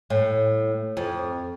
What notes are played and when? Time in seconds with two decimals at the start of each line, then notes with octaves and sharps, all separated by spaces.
0.10 A2
0.97 F2